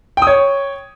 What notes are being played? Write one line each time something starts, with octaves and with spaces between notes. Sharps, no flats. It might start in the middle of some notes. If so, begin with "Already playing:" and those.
C#5 G5 D#6